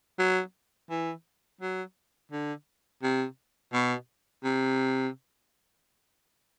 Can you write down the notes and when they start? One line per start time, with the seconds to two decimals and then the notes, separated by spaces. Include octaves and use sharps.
0.19 F#3
0.90 E3
1.61 F#3
2.32 D3
3.03 C3
3.73 B2
4.44 C3